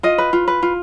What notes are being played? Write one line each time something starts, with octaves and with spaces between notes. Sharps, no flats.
F4 D#5
B4
F4
B4
F4